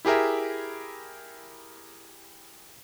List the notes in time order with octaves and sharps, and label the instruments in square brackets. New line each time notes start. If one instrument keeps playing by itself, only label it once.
[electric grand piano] E4 G4 G#4 A#4 E5